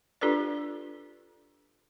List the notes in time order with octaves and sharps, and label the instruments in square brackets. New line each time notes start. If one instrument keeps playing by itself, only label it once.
[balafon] D4 F4 G4 A4 B4 D5